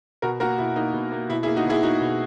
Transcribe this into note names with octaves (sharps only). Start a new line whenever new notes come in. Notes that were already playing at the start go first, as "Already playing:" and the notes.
B2 F#4 A#4
A#3 F#4 A#4
B2 E4
A#3 D#4
B2
A#3
B2 E4
E4 G#4
A#3
D#4 F#4
B2 E4 G#4
A#3 D#4 F#4
B2